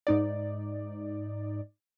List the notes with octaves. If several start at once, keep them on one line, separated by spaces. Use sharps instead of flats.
G#2 D#4 D5